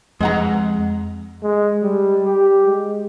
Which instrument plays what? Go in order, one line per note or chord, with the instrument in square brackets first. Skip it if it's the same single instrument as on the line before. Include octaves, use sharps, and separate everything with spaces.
[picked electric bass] F2 [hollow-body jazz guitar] G#3 F#5 A#5
[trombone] G#3
G3
G4
G#3